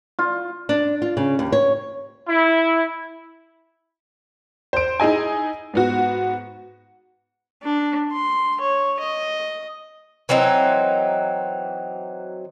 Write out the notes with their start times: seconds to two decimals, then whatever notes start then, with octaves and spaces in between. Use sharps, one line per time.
0.19 F4
0.69 D4
1.02 F4
1.17 C#3
1.39 D#2
1.52 C#5
2.28 E4
4.73 C5 D7
5.00 D#4 E4 G#4 D#5 G#5
5.74 G#2 B3 F#4
7.63 D4
8.12 C6
8.60 C#5
8.99 D#5
10.29 E3 F#3 C4 D#4